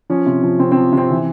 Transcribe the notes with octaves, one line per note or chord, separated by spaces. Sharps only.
F3 C#4
C3
F3
C3 C4
C4
F3
C3
C4
E3